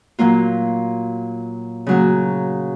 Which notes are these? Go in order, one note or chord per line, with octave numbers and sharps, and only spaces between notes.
A#2 F#3 A#3 F4
C#3 F#3 A#3